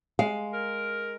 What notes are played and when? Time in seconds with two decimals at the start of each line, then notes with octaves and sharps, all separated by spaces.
0.19 G#3 F5
0.54 A#4